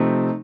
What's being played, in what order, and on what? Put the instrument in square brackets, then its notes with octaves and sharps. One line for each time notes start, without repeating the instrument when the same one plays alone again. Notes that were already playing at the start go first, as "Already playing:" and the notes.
Already playing: [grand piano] C3 F3 A3 C4 D#4